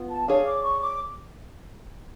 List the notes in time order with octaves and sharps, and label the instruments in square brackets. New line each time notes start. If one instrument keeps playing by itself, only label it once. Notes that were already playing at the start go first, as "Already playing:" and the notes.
Already playing: [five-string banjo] B3 F4
[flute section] A5
[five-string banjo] D4 G#4 C#5 [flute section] F5
[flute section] D6
C#6
D6